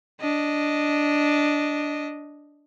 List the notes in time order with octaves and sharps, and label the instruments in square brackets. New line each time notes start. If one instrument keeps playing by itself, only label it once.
[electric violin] D4 D#5